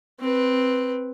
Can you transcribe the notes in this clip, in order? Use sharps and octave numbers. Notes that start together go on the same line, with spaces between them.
C4 B4